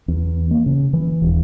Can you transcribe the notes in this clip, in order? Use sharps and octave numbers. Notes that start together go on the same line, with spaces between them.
E2
A#3
C#3
E3
D#1